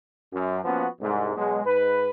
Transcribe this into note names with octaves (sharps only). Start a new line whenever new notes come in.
F#2
F3 A#3 B3 C#4 F#4
C2 G#2
B2 F#3 G#3
G#2 B4